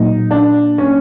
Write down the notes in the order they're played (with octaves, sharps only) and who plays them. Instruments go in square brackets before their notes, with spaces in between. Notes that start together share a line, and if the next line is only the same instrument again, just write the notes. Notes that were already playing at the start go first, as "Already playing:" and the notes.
Already playing: [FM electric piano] A#2 F#3 A#3 [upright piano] D#4
[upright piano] D4
C#4